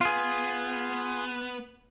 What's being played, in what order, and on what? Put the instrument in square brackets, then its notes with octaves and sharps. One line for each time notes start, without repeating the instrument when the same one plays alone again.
[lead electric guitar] B3 [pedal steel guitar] F4 G#4